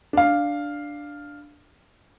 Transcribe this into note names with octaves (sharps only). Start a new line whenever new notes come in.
D4 F5